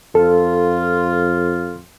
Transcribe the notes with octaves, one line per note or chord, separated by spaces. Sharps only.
F2 F4 A4